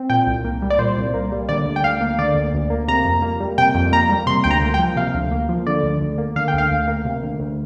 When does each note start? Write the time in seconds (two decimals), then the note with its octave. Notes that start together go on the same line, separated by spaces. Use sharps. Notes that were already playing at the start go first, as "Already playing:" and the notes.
Already playing: C4
0.10 A#2 G5
0.27 C2
0.44 A#3
0.62 G3
0.70 D5
0.79 A#2 C5
0.97 C2
1.14 A#3
1.32 G3
1.49 D3 D5
1.66 D2
1.76 G5
1.84 D2 F5
2.01 A#3
2.19 D3 D5
2.35 D2
2.54 D2
2.70 A#3
2.88 C3 A#5
3.05 F2
3.22 A#3
3.40 G3
3.58 C3 G5
3.75 F2
3.92 A#3 A#5
4.09 G3
4.27 C3 C6
4.44 D2 G5
4.51 A#5
4.62 A#3
4.74 G5
4.79 F3
4.96 C3 F5
5.14 D2
5.31 A#3
5.49 F3
5.66 D3 D5
5.83 D2
6.00 D2
6.18 A#3
6.36 D3 F5
6.48 G5
6.53 D2 F5
6.71 D2
6.88 A#3
7.05 C3
7.23 D2
7.40 D2